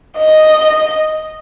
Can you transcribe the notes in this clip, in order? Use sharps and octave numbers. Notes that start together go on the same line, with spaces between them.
D#5